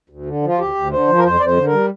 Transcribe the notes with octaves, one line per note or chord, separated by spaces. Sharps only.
D2
D3
F3 F4
D2 G4
D2
D3 C5
F3
A#4
F2 C5
F2 D5
C5
D3
A#4
G3